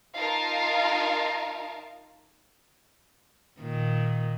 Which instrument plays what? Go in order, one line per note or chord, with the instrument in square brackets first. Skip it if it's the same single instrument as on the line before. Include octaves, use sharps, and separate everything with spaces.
[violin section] D#4 F4 A#4 F5 A5
[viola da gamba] A#2 D#3